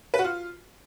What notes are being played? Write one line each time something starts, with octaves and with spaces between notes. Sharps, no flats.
B4
F#4
F4